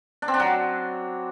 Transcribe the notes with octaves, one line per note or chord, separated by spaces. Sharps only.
D4
C4
D4
F#3